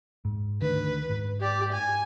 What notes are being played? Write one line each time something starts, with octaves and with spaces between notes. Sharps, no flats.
G#2
D2 D#3 D4 B4
G#2
G4 D5
G#5